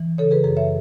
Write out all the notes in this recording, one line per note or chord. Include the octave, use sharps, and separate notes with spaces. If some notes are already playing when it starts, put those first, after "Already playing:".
Already playing: E3
C#3 A4 C#5
G#4 B4
F#2 G#4 B4
C#5 E5